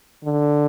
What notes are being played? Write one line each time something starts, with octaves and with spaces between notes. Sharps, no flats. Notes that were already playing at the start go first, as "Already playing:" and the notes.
D3